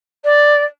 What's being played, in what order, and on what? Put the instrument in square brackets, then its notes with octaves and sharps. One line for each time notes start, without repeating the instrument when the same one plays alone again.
[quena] D5